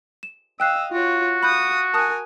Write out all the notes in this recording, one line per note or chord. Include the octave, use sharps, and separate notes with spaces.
E7
D#5 F5 G5 E6 F#6 C7
F4 F#4 C#5
F5 B5 D#6 F#6 G6
A#4 G#5 A5 D#6 F#6